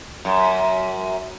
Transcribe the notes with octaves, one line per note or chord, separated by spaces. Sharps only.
F#2